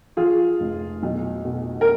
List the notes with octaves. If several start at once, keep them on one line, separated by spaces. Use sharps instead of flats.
F3 F4 G#4
F1
B1
B2
A#4